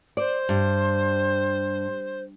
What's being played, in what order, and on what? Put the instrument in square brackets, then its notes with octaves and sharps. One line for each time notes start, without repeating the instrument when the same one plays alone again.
[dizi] C5 [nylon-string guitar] D5
[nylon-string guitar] G2